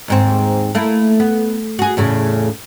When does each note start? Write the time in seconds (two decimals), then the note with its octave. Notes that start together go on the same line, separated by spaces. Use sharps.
0.08 D#2 G#2 C4
0.75 A3 A#3 E4
1.20 B3
1.79 F#4 G#4
1.97 E2 A2 C#3